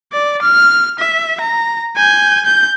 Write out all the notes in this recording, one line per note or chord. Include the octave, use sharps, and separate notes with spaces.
D5
F6
E5
A#5
G#5 G6
G6